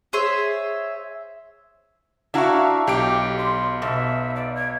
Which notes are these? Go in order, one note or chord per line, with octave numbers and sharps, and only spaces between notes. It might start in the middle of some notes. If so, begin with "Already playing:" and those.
G#4 C5 C#5 E5
D4 E4 F#4 E5 F5 A#5 C#6
B1 G4 D6 D7
C6
B2 E5
D5
G#6